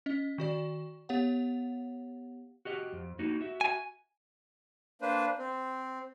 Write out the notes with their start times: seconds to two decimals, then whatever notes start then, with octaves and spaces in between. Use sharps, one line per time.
0.06 C#4 D#5
0.38 D#3 F#4 D5
1.09 B3 G4 C#5 F5 F#5
2.65 F#4 G4 D#5
2.93 F2
3.19 A#3 D#4 F#4
3.41 F#4 E5
3.61 G#5
5.02 A#3 D4 B4 C5
5.38 C4